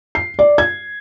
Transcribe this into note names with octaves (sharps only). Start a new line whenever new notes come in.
C7
D5
G#6